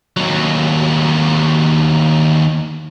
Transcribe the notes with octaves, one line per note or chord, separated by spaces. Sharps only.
D#2 F#3